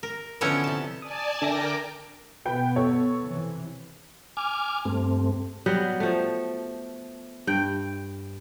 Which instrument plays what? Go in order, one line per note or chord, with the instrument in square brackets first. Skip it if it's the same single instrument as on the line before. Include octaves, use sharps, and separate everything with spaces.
[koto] A#4
D3 F3 B3 C#4 E4 C#5
C3 A5
[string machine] D5 G#5 A5 [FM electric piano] D#6
[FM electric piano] D3 E5 A#6 [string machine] A#4 G5 D6
[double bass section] B2 B3 [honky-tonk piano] B4 G5 B5
[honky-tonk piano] A4 C#5
[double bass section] C3 E3
[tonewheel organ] G#5 D6 F6
G2 A3 C4
[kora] F#3 G3 B3
F3 A3
G2 G5